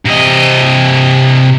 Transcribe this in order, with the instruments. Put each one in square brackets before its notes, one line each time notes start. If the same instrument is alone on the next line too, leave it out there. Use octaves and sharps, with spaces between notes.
[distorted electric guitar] C3 D#5